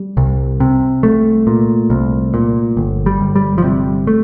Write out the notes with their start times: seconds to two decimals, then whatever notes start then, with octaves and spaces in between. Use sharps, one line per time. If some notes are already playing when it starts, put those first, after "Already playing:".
Already playing: G3
0.17 C2
0.60 C3
1.03 C2 A3
1.47 A#2
1.90 C2
2.34 A#2
2.77 G1
3.06 G3
3.21 G1
3.36 G3
3.58 F3
3.64 C3 G3
4.07 A3